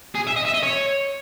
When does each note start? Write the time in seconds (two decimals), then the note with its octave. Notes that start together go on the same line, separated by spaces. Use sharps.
0.15 G#4
0.27 E5
0.36 D#5
0.45 E5
0.54 D#5
0.63 C#5